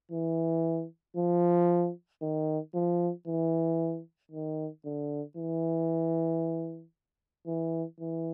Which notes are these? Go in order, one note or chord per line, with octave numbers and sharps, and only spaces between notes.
E3
F3
D#3
F3
E3
D#3
D3
E3
E3
E3